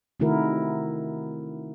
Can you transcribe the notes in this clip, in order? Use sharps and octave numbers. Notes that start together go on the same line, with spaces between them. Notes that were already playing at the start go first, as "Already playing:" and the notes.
C3 D#3 A3 E4 F#4 A#4